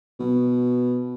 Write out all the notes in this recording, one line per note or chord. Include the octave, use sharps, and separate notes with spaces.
B2